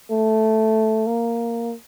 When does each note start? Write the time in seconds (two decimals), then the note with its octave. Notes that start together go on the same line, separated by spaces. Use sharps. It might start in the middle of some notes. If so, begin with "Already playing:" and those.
0.11 A3
1.07 A#3